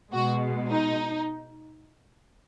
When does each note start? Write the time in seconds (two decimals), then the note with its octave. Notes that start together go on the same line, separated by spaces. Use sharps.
0.12 B2 G#3 F#4
0.68 D#4